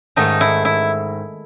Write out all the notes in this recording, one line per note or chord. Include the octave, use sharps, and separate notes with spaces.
G#2 D#3 A3 D#4
E4
E4